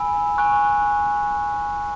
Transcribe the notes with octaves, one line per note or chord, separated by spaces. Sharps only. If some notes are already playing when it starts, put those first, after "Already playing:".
Already playing: G#5 B5 E6
G#5 C#6 F#6